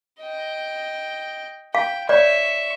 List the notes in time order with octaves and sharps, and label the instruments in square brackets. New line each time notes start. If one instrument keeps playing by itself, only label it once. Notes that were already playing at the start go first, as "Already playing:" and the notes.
[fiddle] D#5 G5
[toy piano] F5 [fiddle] G5
[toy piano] C#5 D5 [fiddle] E5 C#6